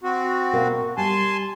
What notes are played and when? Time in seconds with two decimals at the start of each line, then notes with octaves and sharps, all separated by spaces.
0.04 C4 F#4
0.53 B2 A#4 F5
0.97 G3 G#5 A5 C6